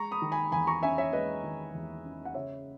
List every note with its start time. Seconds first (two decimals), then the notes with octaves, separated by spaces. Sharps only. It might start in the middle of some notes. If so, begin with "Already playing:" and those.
Already playing: G#3 A#5 C#6
0.11 B5 D#6
0.22 D#3
0.32 G#5 B5
0.52 E2 G#5 B5
0.67 A#5 C#6
0.82 C#4 E5 G#5
0.98 C#5 E5
1.13 G#3 B4 D#5
1.44 D#3
1.74 E2
2.04 C#4
2.25 F#5
2.34 C#3 C#5 E5